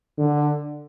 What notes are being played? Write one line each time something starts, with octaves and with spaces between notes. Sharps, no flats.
D3